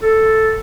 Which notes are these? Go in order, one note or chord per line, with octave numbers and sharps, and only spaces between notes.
A4